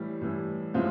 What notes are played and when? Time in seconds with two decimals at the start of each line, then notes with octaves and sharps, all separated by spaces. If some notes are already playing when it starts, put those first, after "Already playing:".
Already playing: A2 E3 G3
0.22 A2 E3 G3
0.74 A2 F3 G#3 C4 F4